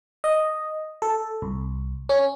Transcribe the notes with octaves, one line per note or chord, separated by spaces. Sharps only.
D#5
A4
C2
C#4